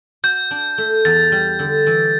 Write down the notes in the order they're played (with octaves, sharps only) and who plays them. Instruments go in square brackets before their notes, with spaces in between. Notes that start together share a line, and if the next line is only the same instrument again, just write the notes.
[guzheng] F#4 [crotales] G6
[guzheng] D4
A3
[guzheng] E2 [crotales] A6
[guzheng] G3
D3
E3